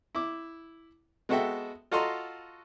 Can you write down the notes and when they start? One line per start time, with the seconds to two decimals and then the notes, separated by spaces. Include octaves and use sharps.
0.15 E4 D6
1.29 G#3 B3 F#4 A4 E5 G5
1.92 F4 F#4 A4 D#5 A#5 C6